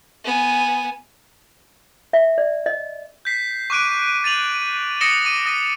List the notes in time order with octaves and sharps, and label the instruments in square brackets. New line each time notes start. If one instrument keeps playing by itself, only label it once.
[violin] B3 G#5
[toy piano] E5
D5
D#5
[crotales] G6 B6 C7
C#6 D6 F#6 D7 D#7
A6 D#7 F7 F#7
D#6 A#6 C#7 D7 E7 G7
D6 D#7
D#6 A#6 D#7